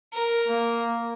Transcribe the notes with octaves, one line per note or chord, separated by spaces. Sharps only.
A#4
A#3